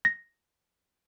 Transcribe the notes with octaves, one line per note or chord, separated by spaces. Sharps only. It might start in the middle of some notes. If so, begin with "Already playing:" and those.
A#6